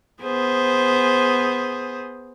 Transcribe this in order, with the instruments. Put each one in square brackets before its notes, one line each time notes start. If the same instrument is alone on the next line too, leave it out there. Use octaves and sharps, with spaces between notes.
[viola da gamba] B3 G#4 C5